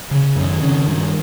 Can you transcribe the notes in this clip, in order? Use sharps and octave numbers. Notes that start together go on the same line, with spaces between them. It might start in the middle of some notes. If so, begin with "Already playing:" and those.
C#3
F#2 D#3
C#3
G2